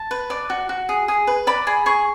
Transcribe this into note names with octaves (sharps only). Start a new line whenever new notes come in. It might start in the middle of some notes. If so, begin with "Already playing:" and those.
Already playing: A5
B4
D5
F#4
F#4
G#4
G#4
B4
D5 B5
G#4 B5
G#4 C#6